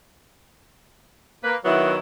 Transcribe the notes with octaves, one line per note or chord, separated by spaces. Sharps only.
A#3 B4
D#3 F#3 B3 E4